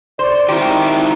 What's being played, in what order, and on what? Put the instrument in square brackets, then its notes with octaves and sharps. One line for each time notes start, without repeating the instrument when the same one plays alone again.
[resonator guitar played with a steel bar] C5 [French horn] D5
[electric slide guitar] D#3 C4 [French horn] E4 [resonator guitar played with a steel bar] G4